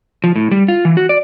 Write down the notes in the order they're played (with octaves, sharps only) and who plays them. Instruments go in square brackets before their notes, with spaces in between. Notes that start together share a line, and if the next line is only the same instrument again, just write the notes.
[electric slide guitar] F3
A2
G3
F4
E3
F#4
D5